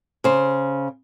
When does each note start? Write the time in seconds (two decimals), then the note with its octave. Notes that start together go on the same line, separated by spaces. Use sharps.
0.24 C#3 C5